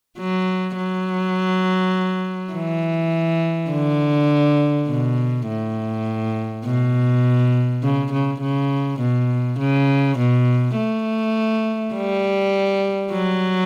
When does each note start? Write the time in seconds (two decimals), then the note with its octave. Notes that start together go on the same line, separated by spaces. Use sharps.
0.18 F#3
0.76 F#3
2.53 E3
3.71 D3
4.88 B2
5.48 A2
6.65 B2
7.83 C#3
8.12 C#3
8.42 C#3
9.00 B2
9.59 C#3
10.18 B2
10.76 A3
11.95 G3
13.12 F#3